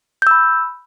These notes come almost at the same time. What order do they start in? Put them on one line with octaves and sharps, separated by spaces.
G6 E6 B5